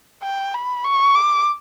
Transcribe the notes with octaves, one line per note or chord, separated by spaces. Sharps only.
G5
B5
C#6
D6